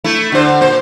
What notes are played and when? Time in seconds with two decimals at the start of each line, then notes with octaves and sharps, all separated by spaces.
0.04 A3 E4
0.32 D3 C5
0.61 A#2 C5